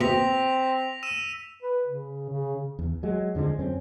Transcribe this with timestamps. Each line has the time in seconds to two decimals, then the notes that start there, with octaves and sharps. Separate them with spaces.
0.01 B2 C4 A#6 B6 F7
1.03 E6 D#7 E7
1.62 B4
1.87 C#3
2.30 C#3
2.79 E2
3.03 F#3 G#3
3.35 F2 D3 F3 G#3
3.59 F#2 C4 C#4